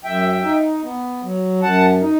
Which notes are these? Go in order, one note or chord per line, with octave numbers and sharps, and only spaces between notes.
F#2 E5 G5
D#4
B3
F#3
F#2 F#5 A5
D#4